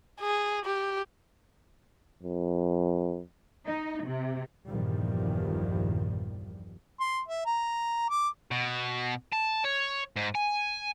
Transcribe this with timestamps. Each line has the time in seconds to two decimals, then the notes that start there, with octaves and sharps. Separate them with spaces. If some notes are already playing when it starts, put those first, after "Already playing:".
0.20 G#4
0.65 G4
2.23 F2
3.66 D#4
4.04 C3
4.68 A#1 E2 G2 D#3 F3 G3
7.00 C6
7.28 E5
7.46 A#5
8.10 D6
8.51 B2
9.32 A5
9.64 C#5
10.16 G#2
10.35 G#5